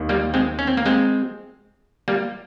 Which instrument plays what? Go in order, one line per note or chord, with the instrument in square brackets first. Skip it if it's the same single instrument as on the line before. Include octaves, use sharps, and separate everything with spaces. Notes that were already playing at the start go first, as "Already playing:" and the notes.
Already playing: [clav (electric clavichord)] D#2 D#3
G3 A#3
G#3 C4
C#4
C4
A#3
G#3 C4
G3 A#3